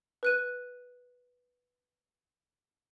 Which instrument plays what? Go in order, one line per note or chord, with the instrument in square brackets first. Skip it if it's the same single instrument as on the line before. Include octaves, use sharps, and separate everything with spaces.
[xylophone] B4 F#6 D#7